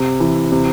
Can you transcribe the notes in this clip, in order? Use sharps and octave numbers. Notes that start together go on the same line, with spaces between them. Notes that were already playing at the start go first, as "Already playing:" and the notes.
Already playing: C3
E3
C3